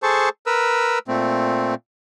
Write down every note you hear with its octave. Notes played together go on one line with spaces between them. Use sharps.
G#4 A4 C5 A5 C#6
A#4 B4 E6
A#2 A3 C4